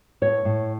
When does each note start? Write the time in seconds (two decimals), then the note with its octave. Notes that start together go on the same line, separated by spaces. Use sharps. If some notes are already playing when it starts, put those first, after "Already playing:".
0.22 A2 C#5
0.45 A2